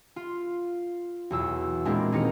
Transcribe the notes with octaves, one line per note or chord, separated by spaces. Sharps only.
F4
B1 E2 E6
A#2 G#3 A#3 C4 D4 E4
D#1 D#4 A#4 C#7